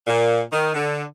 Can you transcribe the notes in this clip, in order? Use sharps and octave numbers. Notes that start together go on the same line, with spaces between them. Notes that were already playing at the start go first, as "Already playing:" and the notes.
A#2
D#3
D3